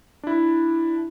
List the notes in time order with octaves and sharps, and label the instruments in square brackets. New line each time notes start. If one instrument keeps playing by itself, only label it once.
[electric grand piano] D4 E4